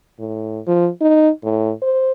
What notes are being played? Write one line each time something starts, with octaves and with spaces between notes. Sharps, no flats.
A2
F3
D#4
A2
C5